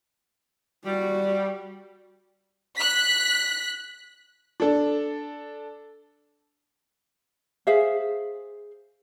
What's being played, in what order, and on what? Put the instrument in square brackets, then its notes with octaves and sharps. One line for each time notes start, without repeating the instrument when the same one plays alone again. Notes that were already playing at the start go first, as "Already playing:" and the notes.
[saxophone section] G3 [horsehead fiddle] F#4
[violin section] F#6 B6
[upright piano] D4 A4
[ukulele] G#4 C5 E5 F5